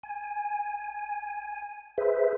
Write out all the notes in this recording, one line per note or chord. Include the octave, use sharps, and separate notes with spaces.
G#5
G#4 B4 C5 E5